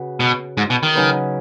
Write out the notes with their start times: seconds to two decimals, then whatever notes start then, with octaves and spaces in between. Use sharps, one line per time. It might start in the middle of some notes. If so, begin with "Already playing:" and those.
Already playing: C#3 F#4 B4
0.20 B2
0.57 G#2
0.70 B2
0.83 D#3
0.95 C#3 F#3 D#4 B4